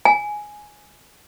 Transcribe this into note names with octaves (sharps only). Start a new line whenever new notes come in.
G#5